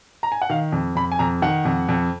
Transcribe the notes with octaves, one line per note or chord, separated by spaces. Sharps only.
A#5
G#5
F#5
D#3 F5
F2
F2 B5
G#5
F2 A#5
D#3 F#5
F2
F2